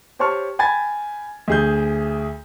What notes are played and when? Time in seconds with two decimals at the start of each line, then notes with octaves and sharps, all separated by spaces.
0.19 G4 C5 C#5 A5 C#6 F6
0.59 G5 G#5 B5 G#6 A6
1.48 D2 G#4 G6